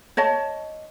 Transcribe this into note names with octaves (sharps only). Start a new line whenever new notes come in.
C#5 D#5 A5